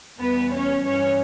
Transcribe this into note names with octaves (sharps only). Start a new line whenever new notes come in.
E2 B2 G3 B3 B4
C#4 C#5
G2 E3 G3 C#4 C#5